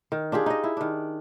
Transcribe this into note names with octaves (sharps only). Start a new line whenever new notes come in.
D#3
D4 F4 G4 G#4
D#4 D#5
E4
D#3 D4